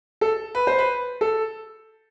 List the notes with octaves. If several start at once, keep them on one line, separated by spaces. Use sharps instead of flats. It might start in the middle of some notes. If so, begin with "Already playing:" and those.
A4
B4
C5
B4
A4